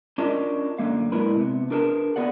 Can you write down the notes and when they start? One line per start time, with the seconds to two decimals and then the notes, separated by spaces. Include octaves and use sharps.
0.18 C#4 D4 F4 A#4 D#5
0.78 F#2 D3 A#3 F5
1.12 A#2 G#3 D4 E4 A#4 B4
1.36 C3 B3
1.71 D4 G#4 A#4 B4 G5 A5
2.16 A3 B3 G#4 D5 F#5